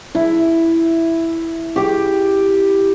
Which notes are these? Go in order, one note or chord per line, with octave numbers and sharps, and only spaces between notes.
E4
G4 G5